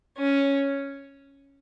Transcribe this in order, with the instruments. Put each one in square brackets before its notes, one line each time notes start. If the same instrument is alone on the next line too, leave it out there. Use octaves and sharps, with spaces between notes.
[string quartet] C#4